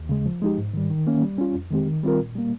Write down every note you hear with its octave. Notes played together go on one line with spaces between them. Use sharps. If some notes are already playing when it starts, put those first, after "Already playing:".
Already playing: D#2
C#3 G#3
F3
G#3 D#4 G4
G#2
D#3 G3
D#3
A#3 C#4
G3
C#4 F4
F2
D#3 G#3 C4 G4
D#3
G3 C4 F4 A#4
A#2
G3 A#3